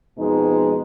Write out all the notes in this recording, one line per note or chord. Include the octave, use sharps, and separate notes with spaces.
F2 B2 G#3 D#4